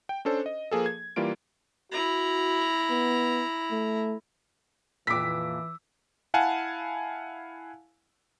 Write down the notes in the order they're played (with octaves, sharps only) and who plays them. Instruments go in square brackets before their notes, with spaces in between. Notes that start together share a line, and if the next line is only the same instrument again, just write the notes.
[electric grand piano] G5
C#4 D4 A4 C5
D#5
F3 A#3 G#4 A4
G#6
E3 G3 A#3 F4 D7
[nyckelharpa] E4 A#5 [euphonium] F#4
[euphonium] B3
A3
[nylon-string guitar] F2 A#2 [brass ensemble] E3 [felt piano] D6 B6 [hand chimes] E6
[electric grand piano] E4 F5 F#5 G#5 A5